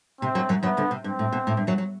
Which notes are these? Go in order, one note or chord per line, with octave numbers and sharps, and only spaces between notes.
C3 C4
F#2 F#3
F#2 F#3
F#2 F#3 B3
D2 D3
C3
G2 C4
A2
B2
A2
G2
F#2 F#3
F#3